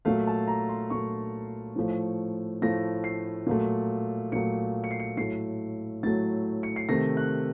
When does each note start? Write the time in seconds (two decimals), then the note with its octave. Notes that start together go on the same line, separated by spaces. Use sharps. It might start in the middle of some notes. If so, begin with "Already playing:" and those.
0.05 A#2 F#3 A3 F5
0.27 A5
0.48 A#5
0.69 C6
0.90 A#2 F#3 A3 C#6
1.76 A2 F3 A3
2.62 A2 F3 A3 A#6
3.04 C7
3.47 A#2 F#3 A3
4.32 A#2 F#3 A3 C#7
4.84 C#7
4.91 C7
5.00 C#7
5.17 A2 F#3 A3 C7
6.03 A2 F#3 A3 A6
6.63 C#7
6.76 C7
6.89 C3 D#3 A3 A#6
7.17 F#6